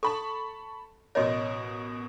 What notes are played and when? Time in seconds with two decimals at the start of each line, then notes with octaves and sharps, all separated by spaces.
0.03 A4 A5 B5 C#6
1.15 A1 B2 A#4 C#5 D#5 C6